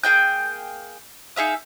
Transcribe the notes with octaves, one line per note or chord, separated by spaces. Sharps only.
A#3 G#4 G5 G6
D#4 G#4 E5 F5